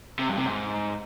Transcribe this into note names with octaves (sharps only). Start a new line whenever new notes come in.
C3
G2
C3
G#2